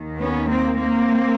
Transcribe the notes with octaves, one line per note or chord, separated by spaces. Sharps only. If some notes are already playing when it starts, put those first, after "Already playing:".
Already playing: D#2 D#3
B3 C#4
A#3 C4
A#3 C4